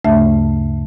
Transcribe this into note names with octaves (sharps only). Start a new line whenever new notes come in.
D2 G2 C#3 A3 E5 A5